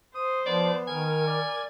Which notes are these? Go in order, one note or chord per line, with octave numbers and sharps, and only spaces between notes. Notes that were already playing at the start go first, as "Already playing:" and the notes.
C5 D#6
F3 B3 D5
D#3 A#4 G#5
D5